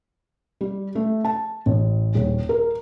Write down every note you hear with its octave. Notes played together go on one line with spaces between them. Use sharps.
G3
A3
A5
A1
D#1
A#4